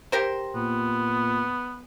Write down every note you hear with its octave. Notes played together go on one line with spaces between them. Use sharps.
G4 A#4 C5
A#2 B3